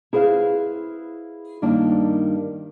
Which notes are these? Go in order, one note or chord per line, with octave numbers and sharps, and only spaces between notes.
E4 G#4 B4 C5 F5
G2 D#3 A#3 D4